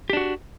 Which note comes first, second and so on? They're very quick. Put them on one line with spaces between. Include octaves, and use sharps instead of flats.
G4 D4 F#4